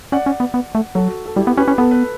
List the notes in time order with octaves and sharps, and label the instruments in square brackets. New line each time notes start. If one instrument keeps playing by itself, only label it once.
[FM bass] C#4 [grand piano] D5 F#5
[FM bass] C#4
B3
B3
A3
[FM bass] F#3 [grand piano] F#4 A4
[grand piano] A4
[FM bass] G3 [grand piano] E4 G4
[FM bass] B3
[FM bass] C#4 [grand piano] G4 B4
[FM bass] C#4
[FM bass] B3 [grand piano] A4
[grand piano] B4